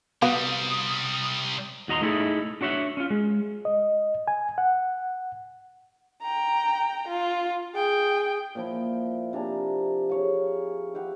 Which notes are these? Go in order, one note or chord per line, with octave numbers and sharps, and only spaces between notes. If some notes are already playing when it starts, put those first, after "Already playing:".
C3 G3 B3 F#4 F5 D#6
D#2 F#4 D#5 A#5 C6
A3 D#4 E4 G#4 A4
D4 F#4 C#5 E5 F#5
C#4 F4
G#3
D#5
G#5
F#5
G5 A#5
F4
G#4 G5
A#2 F3 E4
C3 D4 G#5 A#5
G#4 C#5 F5
E4 G4 F5 F#5